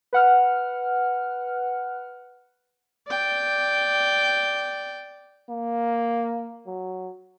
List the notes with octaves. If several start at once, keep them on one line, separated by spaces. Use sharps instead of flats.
B4 F#5 F6
D5 G5
A#3
F#3